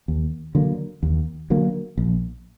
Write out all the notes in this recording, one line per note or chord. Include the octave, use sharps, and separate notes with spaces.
D#2
D3 F#3 A#3
D#2
D3 F#3 A#3
A#1